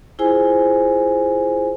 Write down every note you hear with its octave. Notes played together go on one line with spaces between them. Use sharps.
E4 F4 G#4 C5 G#5